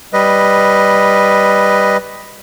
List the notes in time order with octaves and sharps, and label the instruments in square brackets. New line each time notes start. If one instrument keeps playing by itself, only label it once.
[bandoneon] G3 B4 D#5